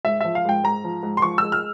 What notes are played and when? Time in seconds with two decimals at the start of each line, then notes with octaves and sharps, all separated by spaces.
0.05 G#2 E5
0.21 F3 E5
0.35 F5
0.45 G#2 G5
0.63 G#2 A#5
0.84 F3
1.03 G#2
1.17 C6
1.22 F3 C#6
1.38 G#3 E6
1.52 F6